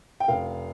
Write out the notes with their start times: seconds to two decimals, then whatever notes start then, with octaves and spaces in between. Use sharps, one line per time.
0.20 G5
0.28 F1 F5